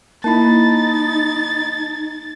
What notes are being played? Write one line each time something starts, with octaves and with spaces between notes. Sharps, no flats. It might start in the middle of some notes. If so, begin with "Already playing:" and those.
A#3 D#4 E4 A5 B5 A6